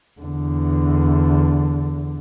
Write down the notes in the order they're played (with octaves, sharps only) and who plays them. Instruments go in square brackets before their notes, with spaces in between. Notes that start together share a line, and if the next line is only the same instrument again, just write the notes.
[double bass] E2 D3